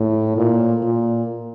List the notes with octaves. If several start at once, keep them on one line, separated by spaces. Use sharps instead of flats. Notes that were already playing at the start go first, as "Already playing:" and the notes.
Already playing: A2
A#2
A#2